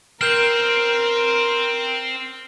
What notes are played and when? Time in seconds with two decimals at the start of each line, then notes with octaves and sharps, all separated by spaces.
0.21 C4 A#4 F6 G6